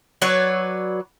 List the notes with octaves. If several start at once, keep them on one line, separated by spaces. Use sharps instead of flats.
F#3 B4 C#5 D5